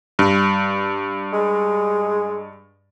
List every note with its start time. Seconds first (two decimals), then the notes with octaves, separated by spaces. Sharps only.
0.19 G2
1.33 G#3